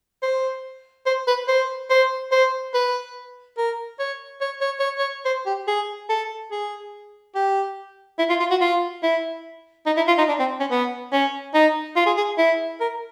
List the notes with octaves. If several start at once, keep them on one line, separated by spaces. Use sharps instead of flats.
C5
C5
B4
C5
C5
C5
B4
A#4
C#5
C#5
C#5
C#5
C#5
C5
G4
G#4
A4
G#4
G4
E4
F4
F4
F#4
F4
E4
D#4
E4
F4
D#4
D4
C4
C#4
B3
C#4
D#4
F4
G#4
G#4
E4
A#4